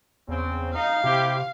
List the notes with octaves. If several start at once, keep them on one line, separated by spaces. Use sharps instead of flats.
E2 C#3 C4
D#4 F5
C3 C4 E4 G4